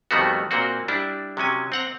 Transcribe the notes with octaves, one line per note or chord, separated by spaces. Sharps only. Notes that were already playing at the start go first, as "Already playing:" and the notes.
F2 D#3 G3 A3 B3 F#4
A#2 A#3 C4 F#4
G3 D4 E4
C3 F#3 C#4 G#5
C4 F#5 A#5